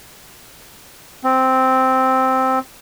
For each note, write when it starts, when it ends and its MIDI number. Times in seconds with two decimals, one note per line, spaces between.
1.24 2.59 60